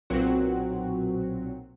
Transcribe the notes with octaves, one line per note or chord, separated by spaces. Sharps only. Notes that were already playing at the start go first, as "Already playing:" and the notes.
B1 A#2 F#3 C4 F#4